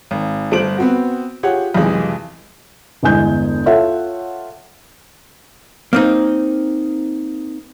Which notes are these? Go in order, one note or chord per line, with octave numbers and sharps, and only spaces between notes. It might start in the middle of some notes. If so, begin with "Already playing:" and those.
G#1
G1 A3 C5 D7 F#7
B3 C4 F#4
F4 G4 G#4 C#5 F#5
B1 F2 C3 E3 G#3
G1 E2 G#3 G#5 G6
F4 A4 C#5 E5 F#5
A#3 C4 D#4